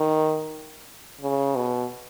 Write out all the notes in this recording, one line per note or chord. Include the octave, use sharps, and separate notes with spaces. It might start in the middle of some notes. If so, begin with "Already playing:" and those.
Already playing: D#3
C#3
B2